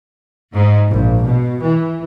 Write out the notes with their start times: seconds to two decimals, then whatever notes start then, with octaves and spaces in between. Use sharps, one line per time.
0.53 G#2
0.90 A#1
1.25 B2
1.61 E3